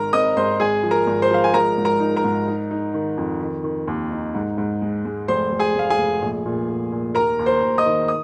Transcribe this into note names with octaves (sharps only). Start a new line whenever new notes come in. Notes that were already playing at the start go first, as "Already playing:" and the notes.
Already playing: G#1 D#3 A#4 A#5
C4 D#5 D#6
G#1 C5 C6
G#1 G#4 G#5
F3
A#4 A#5
G#1
C5 C6
F3 F5
G#5
G#3 A#4 A#5
G#2
A#4 A#5
D#4
A#4 A#5
G#2
D#4
D#4
D#3
F2
D#3
D#3
D#2
D#4
G#2
G#2
G#3
G#3
F1 C5 C6
F1
G#4 G#5
F1 F5
G#4 G#5
F1
A#1
A#2
A#2
A#2
D#2 A#4 A#5
D#2
C5 C6
D#2
D#5 D#6
D#3
D#6